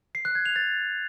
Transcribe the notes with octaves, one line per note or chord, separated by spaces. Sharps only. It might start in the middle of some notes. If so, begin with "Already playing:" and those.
C7
F#6
G#6
F7
A6